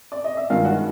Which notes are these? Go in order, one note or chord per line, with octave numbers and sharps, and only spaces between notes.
D5
D#5
E5
G2 D#3 G#3 F4 F5
F#4 F#5